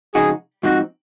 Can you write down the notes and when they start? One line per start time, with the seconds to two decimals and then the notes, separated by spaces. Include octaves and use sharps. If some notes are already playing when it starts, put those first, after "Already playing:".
0.14 F2 C#3 G#3 D#4 F#4 G#4
0.63 G#2 F3 C4 D#4 F#4